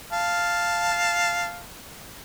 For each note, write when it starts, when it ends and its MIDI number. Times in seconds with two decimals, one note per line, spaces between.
0.12 1.60 77
0.12 1.60 81